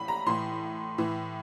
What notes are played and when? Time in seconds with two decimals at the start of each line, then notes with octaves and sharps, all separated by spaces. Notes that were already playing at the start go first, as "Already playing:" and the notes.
Already playing: A2 E3 B5
0.08 A#5
0.26 A2 E3 C6
0.98 A2 E3